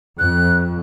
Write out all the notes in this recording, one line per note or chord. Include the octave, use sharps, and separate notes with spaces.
F2 F#6